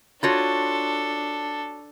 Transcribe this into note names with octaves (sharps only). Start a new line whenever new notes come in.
D4 F4 F#4 A4 C#5